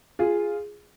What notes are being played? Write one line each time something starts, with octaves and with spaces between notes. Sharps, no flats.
F4 G#4